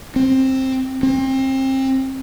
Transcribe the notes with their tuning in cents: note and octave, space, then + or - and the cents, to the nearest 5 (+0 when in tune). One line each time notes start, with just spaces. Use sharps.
C4 +15
C4 +30